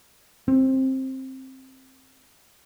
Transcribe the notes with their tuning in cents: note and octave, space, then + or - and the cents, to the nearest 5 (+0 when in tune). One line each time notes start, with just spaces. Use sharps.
C4 +15